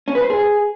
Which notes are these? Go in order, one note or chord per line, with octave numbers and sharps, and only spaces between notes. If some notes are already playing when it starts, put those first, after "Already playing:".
C#4
B4
C5
G#4